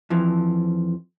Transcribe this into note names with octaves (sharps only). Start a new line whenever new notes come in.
F2 E3 F3